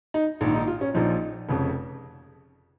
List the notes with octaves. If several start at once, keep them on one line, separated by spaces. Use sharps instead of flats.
D#4
A#1 G#2 D#3
D#4
F4
C#4
A#1 A#2 F3 D#4
F1 F2 C#3